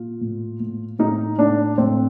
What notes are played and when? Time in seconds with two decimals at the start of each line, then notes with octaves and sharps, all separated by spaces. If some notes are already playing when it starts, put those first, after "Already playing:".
Already playing: A#2 F4
0.21 A2
0.60 A2
0.99 A2 D#4
1.38 A2 D4
1.78 A2 C4